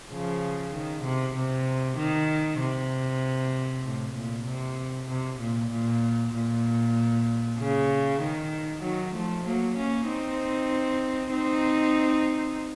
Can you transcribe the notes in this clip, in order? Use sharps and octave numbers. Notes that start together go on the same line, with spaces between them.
C#3 F3
D#3
C3
C3
D#3
C3
A2
A#2
C3
C3
A#2
A#2
A#2
C#3
D#3
D#3 F#3
F3 A3
F#3 A#3
A#3 C#4
C4 D#4
C4 D#4